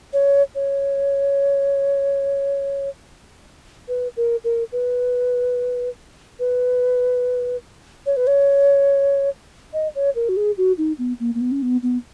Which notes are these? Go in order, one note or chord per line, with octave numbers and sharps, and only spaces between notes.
C#5
C#5
B4
A#4
A#4
B4
B4
C#5
B4
C#5
D#5
C#5
A#4
F#4
G#4
F#4
D#4
B3
A#3
A#3
B3
C#4
B3
B3